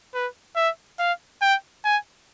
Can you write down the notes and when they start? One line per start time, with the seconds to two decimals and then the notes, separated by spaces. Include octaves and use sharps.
0.14 B4
0.56 E5
0.99 F5
1.42 G5
1.84 G#5